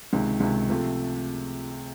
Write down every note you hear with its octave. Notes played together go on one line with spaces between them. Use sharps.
C#2 C3 D#3
C#2 C3 D#3
C3 F3 A3